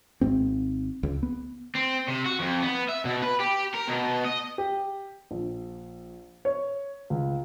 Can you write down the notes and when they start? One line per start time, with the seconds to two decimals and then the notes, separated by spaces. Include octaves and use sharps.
0.21 G#1 G#2 C4
1.03 C#2
1.23 B3
1.75 C4
2.08 C3
2.26 F#4
2.40 F2
2.62 B3
2.89 E5
3.05 B2
3.23 B4
3.40 G4
3.74 A#4
3.88 B2
4.25 D#5
4.58 G4
5.31 A#1
6.45 C#5
7.10 C#2